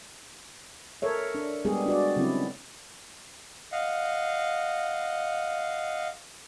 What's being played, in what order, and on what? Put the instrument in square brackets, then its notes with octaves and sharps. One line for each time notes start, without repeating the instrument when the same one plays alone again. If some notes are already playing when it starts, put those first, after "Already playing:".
[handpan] A4 A#4 C#5 E5
D4
G3 G#3 B3 G4 G#4
D4 F#4 D5
C#3 F#3 C4 E4
[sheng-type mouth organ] D#5 F5 F#5